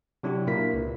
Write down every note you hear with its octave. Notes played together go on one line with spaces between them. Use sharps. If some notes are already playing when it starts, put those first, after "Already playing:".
C3 F#3 D4 E4 F#4 G4
A#2 A#3 E4 A#4 B6
C#2